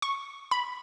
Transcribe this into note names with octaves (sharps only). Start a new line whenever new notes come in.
C#6
B5